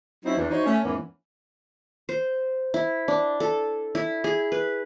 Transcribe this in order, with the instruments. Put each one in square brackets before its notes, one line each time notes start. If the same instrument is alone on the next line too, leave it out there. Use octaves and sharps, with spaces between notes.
[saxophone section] F#3 C4 C#4 D#4 E4
E2 D4
D#4 E4 F#4 C5 C#5
A3 C#4
E2 G#2 E3 A#3 B3 C#4
[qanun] C5
E4
D4
A4
E4
G#4
B4